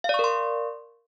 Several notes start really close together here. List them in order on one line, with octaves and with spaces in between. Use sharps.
F5 D5 C#6 A#4 C6